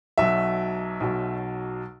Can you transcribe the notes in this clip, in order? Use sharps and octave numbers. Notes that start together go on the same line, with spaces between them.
B1 B2 F#3 E5
B1 B2 F#3